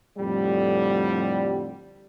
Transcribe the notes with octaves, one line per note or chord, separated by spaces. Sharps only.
F2 A2 D3 G3